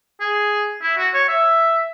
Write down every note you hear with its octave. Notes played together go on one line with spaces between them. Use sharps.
G#4
E4
F#4
C#5
E5